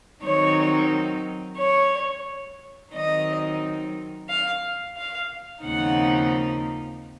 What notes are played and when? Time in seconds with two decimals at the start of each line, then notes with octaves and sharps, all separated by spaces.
0.23 D#3 F#3 C4 D#4 C#5
1.57 C#5
2.92 D#3 F#3 C4 D#4 D#5
4.28 F5
4.96 F5
5.63 D#2 C#3 F3 C4 D#4 F#5